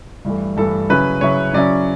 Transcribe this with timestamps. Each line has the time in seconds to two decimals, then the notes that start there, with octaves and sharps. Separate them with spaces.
0.25 G2 E3 A3
0.57 G2 E3 A3 A4
0.89 C#3 F#3 C#4 E4 B4
1.21 C#3 F#3 C#4 E4 C#5
1.53 C#3 F#3 C#4 E4 D5